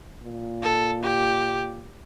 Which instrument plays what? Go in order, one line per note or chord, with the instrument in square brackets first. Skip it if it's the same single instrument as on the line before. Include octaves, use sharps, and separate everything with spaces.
[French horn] A#2
[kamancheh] A4
G4